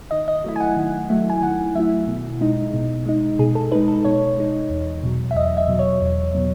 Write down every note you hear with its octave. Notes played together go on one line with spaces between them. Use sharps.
D#3 D#5
D#5
F#3 A3 E4
G#5
F#5
D#3
F#3 A3 E4
G#5
D#3 F#5
F#3 A3 E4 E5
B2
G#3 D#4
B2
G#3 D#4
B2 G#4
A4
G#3 D#4 B4
A4
B2 C#5
G#3 D#4
E2
B2 F#3
E5
E2 D#5
D#5
E5
B2 F#3
C#5
E2
B2 F#3